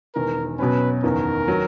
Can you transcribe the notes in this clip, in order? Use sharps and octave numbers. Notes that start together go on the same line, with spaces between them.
E1 E2 D#3 A#4
B2 F#3 C#4 B4
F#1 E2 D#3 A#4
D#3 F#3